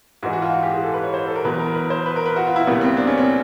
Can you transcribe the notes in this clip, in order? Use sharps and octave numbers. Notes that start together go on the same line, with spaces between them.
G#2 E3 G#3 F#4
F#4
F4
F#4
G4
G#4
A4
B4
C#5
C5
A4
A#4
E2 B2 F#3 B4
A#4
B4
C5
B4
A#4
B4
F#4
F4
E4
C#2 B2 G3 A#3 B3
C4
D4
C#4
C4